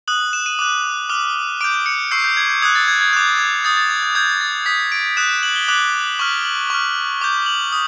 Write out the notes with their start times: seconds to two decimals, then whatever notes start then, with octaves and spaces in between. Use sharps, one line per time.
0.08 D#6 F#6 F#7
0.33 E7
0.46 D#7
0.59 D6 F#6
1.10 D6 F6
1.61 D6 G6 D7
1.86 C#7
2.11 C#6 E6 G6 C7
2.24 G6
2.37 G#6
2.50 G6
2.62 D#6 F#6 G#6
2.75 A6
2.88 G#6
3.01 G#6
3.13 D6 F#6 G6
3.39 G#6
3.64 D#6 G6 A6
3.77 A6
3.90 G#6
4.03 G6
4.15 D#6 G6 G#6
4.41 A6
4.66 D#6 G6 B6
4.92 D7
5.17 D#6 F#6 E7
5.30 E7
5.43 F#7
5.55 G7
5.68 D6 F#6 F#7
6.19 C#6 F6 F#7
6.45 F#7
6.70 C#6 F6
7.21 D6 G6
7.46 F#7
7.72 D#6